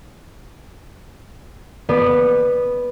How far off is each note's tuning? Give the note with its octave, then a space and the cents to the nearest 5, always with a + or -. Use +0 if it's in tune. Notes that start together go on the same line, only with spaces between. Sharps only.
B3 -5 D5 +25